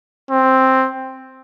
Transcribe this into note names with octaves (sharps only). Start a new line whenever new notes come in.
C4